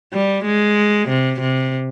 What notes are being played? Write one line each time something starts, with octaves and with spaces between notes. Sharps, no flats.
G3
G#3
C3
C3